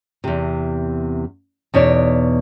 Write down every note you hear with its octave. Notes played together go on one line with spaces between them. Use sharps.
E2 C3
E2 B2 D#4 C#5 D5